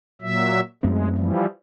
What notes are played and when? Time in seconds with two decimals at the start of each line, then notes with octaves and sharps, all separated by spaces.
0.22 A#2 F#3 E5
0.83 F#2 G#3 A3 C4
1.17 E3 F3 G3